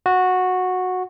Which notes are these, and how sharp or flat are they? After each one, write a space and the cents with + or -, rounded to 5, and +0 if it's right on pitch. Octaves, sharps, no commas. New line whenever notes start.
F#4 -10